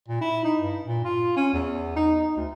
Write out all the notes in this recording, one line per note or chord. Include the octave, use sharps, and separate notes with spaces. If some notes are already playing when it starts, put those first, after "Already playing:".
A#2
E4
D#4
G2
A#2
F4
C#4
E2
D#4
D#4
D2